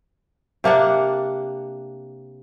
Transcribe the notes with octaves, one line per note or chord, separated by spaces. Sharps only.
C3 A#3 D4 F#5